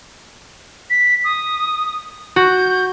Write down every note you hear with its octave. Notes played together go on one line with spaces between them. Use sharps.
B6
D#6
F#4 G6